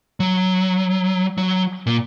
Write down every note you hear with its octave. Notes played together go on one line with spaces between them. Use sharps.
F#3
F#3
A#2